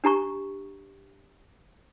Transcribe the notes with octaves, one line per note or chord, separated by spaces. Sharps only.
D4 G4 A#5 C#6